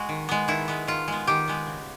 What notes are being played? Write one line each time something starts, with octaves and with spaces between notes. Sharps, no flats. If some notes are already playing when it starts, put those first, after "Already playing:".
Already playing: G#3 F#4
D#3
G#3 B3
D#3 E4
G#3 B3
D#3 F4
G#3 B3
D#3 G4
G#3 B3
C#3